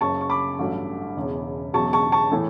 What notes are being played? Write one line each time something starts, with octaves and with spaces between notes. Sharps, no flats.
F#1 F#2 C#3 A5 C#6
C#6
B5 D6
A1 G2 F#3 A3
E1 E2 C#3
E1 E2 C#3 F#3 A5 C#6
A5 C#6
A5 C#6
A2 E3 A3